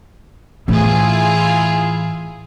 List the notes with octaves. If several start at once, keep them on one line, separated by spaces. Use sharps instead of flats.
A2 E3 E4 F4 G#4